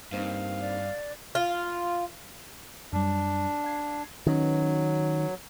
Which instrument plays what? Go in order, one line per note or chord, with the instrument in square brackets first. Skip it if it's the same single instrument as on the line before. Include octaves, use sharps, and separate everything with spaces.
[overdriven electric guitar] G2 [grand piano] A#3 C4 D#4 [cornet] F5
[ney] D5
[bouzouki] F4
[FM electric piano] F#2 G3 [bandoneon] D4
[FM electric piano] F5 G#6 C7
[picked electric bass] D#3 [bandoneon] F#3 [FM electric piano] C#4 F#4 B4